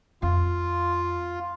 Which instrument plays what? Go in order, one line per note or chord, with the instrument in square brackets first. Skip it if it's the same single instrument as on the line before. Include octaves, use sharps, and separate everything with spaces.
[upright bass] F2 C4 [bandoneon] F4